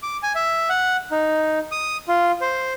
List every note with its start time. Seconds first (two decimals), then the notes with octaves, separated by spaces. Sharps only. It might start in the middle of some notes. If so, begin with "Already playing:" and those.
0.03 D6
0.23 G#5
0.35 E5
0.69 F#5
1.11 D#4
1.72 D#6
2.08 F4
2.41 C5